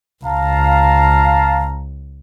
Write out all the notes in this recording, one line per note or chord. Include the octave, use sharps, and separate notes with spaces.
C#2 F5 A5 A#5